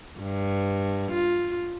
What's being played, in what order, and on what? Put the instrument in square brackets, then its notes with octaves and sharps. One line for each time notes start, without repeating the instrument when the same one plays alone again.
[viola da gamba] G2
F4